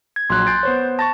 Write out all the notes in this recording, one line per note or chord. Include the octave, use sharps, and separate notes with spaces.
G#6
A#1 F#3 C6 F#6
G#5 G6 A6 C7 D7
B3 C5 C#5
A5 C#6 A6 A#6